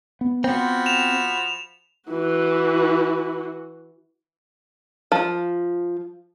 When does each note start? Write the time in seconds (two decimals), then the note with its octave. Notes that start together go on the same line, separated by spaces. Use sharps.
0.21 B3
0.44 F3 C4 F#4 B5
0.86 E7 F7
2.09 E3 F#4
5.12 F3